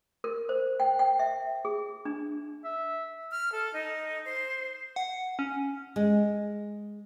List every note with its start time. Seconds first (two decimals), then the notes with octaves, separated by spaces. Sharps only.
0.24 A#4
0.49 C5
0.80 G5
0.99 G5
1.19 E5
1.65 G#4
2.05 D4
2.64 E5
3.31 F6
3.52 A4
3.74 D#4
4.25 C5
4.96 F#5
5.39 C#4
5.96 G#3